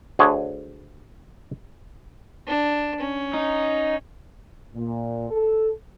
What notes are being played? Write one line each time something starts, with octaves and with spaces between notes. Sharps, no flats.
D2 D3 G#4 C#5
D4
C#4
D#4
A#2
A4